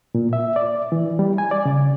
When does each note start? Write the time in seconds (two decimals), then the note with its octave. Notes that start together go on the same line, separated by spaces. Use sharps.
0.15 A#2
0.33 E5
0.56 D5
0.92 E3
1.19 G3
1.38 G#5
1.51 D5
1.65 C#3